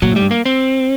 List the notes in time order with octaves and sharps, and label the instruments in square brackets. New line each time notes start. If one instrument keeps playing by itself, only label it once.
[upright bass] A#2 [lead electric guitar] F#3
[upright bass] A2 [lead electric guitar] G3
[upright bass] G2
[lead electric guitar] A#3
C4